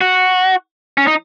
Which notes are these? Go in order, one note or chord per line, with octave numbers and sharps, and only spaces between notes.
F#4
C#4
D#4